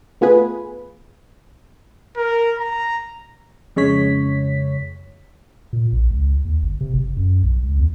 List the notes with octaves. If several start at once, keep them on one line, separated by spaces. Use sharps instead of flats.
A3 B3 F4 G#4 B4
A#4
A#5
F2 C#3 G#3 C#5 B6
A#2
A#1
C#2
D#2
G1
C3
F#1
F#2
B1
C#2
E2